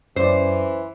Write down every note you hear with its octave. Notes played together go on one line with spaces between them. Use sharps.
F#2 E3 C#4 C5 D5